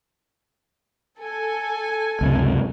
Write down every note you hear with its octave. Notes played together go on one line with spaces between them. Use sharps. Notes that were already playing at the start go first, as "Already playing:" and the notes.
A4 G#5
C#2 F#2 C3